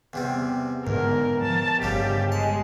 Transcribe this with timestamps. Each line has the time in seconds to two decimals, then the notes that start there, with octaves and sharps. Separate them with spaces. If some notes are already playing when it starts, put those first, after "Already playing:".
0.13 E2 C3 G3
0.87 E2 G#2 D3 A#4
1.41 F3 A5
1.82 G1 G#2 C#3 G3 G4
2.32 G#3 A5